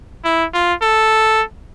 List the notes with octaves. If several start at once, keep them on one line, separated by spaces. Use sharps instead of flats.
E4
F4
A4